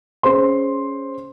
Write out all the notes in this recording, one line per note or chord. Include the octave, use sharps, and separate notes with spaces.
C#4 G#4 C5 C6